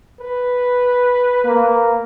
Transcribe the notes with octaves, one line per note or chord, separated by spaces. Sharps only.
B4
A#3